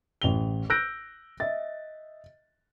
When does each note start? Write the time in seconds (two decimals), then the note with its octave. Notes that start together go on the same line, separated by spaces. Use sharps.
0.22 A1 F7 G7
0.70 E6 F#6 G6 A#6 D7
1.40 D#5 E5 A6